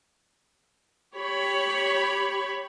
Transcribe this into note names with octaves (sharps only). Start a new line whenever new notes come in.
G4 C#5 B5